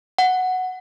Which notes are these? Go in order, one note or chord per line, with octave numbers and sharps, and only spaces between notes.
F#5